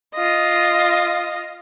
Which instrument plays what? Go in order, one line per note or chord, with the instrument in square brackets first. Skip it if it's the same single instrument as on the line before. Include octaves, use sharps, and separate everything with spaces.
[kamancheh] F4 D#5